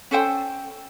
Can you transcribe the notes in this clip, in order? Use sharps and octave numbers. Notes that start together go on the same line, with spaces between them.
C#4 A4 C5 G5